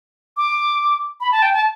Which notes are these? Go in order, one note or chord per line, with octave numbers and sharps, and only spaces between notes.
D6
B5
A5
G5
A5